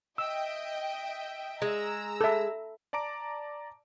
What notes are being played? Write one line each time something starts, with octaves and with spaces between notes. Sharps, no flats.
D#5 E5 G5 E6
G#3 A#5 E6
A4 E5
D5 A5 A#5 D6 D7